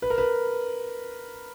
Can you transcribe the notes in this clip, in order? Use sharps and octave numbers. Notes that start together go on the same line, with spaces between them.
B4
A#4
B4